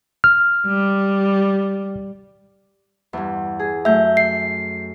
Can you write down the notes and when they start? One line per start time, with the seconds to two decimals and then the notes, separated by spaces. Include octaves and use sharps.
0.24 F6
0.67 G3
3.13 E2 G2
3.59 G#4
3.85 F#2 A3 E5 G6
4.17 C7